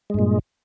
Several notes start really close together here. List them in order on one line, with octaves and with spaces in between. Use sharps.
G#3 G2 A#2